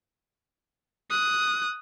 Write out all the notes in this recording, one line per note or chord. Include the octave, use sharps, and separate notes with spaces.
D#6 F#6